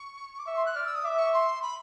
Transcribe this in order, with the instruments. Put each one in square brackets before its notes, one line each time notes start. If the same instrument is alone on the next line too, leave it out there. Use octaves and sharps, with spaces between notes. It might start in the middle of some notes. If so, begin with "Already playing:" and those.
Already playing: [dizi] C#6
D6
[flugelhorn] E5 [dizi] C#6
[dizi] C6
F#6
[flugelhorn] D5 [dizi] F6
[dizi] E6
D#6
[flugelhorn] E5 [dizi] D6
[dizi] C#6
C6
B5